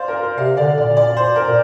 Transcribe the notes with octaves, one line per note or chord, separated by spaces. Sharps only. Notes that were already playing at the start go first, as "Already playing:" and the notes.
Already playing: C5 D5 F5
A#4
C5
C3 F5
D3 D5
A#2 D5
D5
C5
A#4
A#2